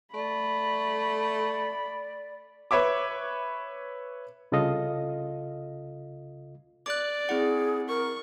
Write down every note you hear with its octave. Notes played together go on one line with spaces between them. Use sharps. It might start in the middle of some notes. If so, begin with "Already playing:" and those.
A3 D5 B5
B4 C#5 E5 D6
C2 C#3 F4 A4 D#5 F5
D5 D6 F#6
C4 E4 G#4 F#5
A#4 C#6